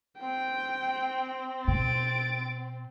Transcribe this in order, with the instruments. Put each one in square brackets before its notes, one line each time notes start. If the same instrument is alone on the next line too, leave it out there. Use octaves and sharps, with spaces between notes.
[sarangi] C4 [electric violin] G5
[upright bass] B2 [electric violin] A6 D7